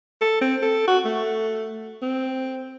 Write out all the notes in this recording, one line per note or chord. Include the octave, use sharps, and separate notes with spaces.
A4
C4
A4
F#4
A3
C4